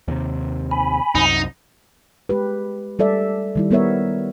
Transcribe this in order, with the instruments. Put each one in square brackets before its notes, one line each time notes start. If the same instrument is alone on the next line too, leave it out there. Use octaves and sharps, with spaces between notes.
[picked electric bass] D#2 C3
[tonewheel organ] G#5 B5
[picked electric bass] C2 F#2 [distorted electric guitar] D#4
[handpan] G#3 G4 B4
G3 A4 D5 E5
D#3 G3 E4
G3 B3 A#4 C#5 E5